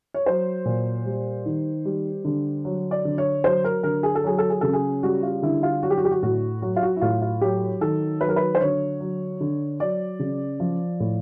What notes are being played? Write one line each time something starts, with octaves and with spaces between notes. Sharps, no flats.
C#5
F#3 C5
A#2
G3
D#3
G3
D3
F#3
D5
D3
C#5
F#3 C5
A#4
D3 A#4
G#4
A4
F#3 G#4
A4
G#4
C#3 A4
G#4
G3 F#4
F4
D3 E4
F4
F#3 F#4
G4
F#4
G4
F#4
A2 F#4
F#3 F#4
F4
F#4
E4
A2 F4
F4
F#3 G4
D#3 A4
F#3 B4
A#4
B4
C5
D3 C#5
F#3
D3
F#3 D5
C#3
F3
A2